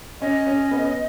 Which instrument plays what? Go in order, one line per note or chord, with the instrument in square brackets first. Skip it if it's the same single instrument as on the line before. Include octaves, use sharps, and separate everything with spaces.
[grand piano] C#4 [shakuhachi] D#5
[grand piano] C#4
B3